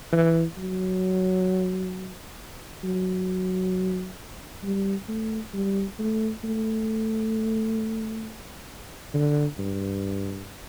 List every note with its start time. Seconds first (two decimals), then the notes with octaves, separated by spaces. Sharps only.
0.13 E3
0.58 F#3
2.84 F#3
4.64 G3
5.08 A3
5.53 G3
5.99 A3
6.44 A3
9.14 D3
9.59 G2